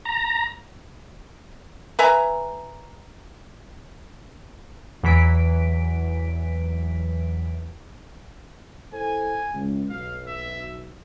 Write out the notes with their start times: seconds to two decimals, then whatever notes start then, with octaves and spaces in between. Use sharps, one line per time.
0.05 A#5
1.99 B4 E5 G#5 A#5
5.03 E2 E3 F#3 B6 D7
8.93 E4 A4 C5 G#5
9.54 C#2
9.90 B1 F5
10.27 E5